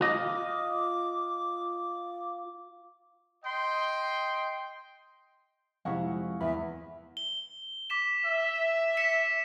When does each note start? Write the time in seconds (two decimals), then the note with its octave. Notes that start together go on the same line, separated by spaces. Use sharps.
0.01 F4 D#5 D6
3.44 D#5 G5 C6
5.85 F2 C3 G#3 E4 F5 F#5 C#6
6.41 E2 E5 B5
7.17 G7
7.90 D6 B6 E7
8.26 E5
8.97 B6 C#7 E7